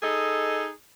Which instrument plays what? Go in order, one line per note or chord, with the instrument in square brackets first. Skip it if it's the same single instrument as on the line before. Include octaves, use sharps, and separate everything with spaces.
[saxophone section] D#4 G#4 A4 D#5